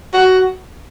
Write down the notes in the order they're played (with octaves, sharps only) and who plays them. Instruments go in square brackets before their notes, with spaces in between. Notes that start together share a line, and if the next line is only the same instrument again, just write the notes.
[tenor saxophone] F#4